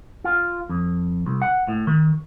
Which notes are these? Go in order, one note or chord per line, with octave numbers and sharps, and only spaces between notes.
F4
F2
C2
F#5
A2
D#3